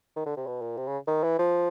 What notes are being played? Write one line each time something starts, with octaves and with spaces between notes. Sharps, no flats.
D#3
D3
C3
B2
A#2
C3
C#3
D#3
E3
F3